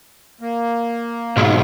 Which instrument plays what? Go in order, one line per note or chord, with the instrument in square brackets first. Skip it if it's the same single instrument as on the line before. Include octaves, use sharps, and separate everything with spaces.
[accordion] A#3
[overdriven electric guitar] B1 G#2